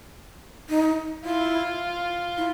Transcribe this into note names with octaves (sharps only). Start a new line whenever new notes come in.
D#4
E4 F4
E4